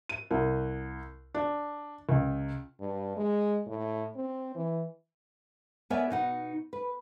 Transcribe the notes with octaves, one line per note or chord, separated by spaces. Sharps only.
D#7
C2
D4
C#2
G2
G#3
A2
C4
E3
B3 A#4 C#5 D5 E5 G#5
B2 D#4 F#5
B4